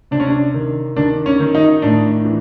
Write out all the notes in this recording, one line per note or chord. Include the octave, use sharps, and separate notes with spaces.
C3 D4
C#4
D4
D#3
D#3 D4
C#4
D#3
D#4
A2 D4
E3